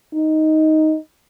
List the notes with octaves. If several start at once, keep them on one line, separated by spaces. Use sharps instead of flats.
D#4